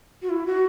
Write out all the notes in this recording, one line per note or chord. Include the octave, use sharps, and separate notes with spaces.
F#4
E4
F#4